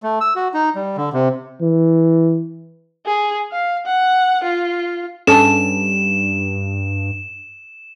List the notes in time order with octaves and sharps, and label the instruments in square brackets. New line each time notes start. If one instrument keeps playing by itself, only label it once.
[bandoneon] A3
E6
F#4
D#4
G3
D3
C3
[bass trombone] E3
[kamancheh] G#4
F5
F#5
F4
[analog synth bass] G2 [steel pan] C#4 A4 A5 [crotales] E7